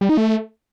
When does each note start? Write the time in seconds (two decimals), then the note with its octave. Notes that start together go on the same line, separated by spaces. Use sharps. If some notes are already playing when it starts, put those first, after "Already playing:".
0.01 G3
0.09 D#4
0.17 A3